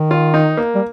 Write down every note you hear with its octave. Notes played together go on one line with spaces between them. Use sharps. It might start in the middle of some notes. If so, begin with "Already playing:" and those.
Already playing: D#3
F4
D#4
A#3
G3